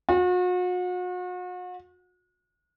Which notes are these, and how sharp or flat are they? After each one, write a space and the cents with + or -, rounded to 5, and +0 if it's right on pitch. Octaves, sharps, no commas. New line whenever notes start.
F#4 -40